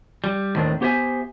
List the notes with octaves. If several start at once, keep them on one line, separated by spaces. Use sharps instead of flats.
G3
D#2 A2 D#3 C4 D4
B3 G4 C5 C#5 E5 G#5